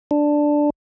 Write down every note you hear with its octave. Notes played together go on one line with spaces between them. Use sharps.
D4